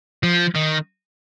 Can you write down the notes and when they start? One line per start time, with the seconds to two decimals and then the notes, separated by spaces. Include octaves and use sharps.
0.23 F3
0.55 D#3